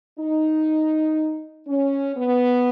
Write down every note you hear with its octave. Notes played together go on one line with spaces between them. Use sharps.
D#4
C#4
B3